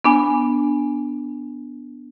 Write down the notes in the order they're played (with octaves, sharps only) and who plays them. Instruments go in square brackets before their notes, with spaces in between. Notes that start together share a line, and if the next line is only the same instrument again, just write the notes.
[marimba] B3 D4 G#5